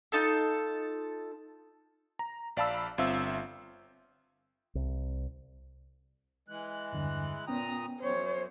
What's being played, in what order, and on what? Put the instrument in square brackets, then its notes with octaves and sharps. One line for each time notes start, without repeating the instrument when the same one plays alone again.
[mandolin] D#4 F4 A4
[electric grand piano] A#5
A#1 D5 F5 A5 B5 E6
G1 C4 F4 E5 F5 E6
[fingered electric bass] C2
[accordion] E3 G#3 F#6
[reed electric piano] E2 G2 D3
[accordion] A#2 A#5 D#6 [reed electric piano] B3 C#4 G5
[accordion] F#2 [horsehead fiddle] C5 C#5